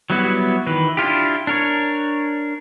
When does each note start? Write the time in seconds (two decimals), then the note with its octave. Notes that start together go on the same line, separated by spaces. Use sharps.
0.10 F#3 G3 B3 E4 F#4
0.66 D#3 E3 B4
0.97 D4 E4 F4 G4
1.47 D4 A#4 C#5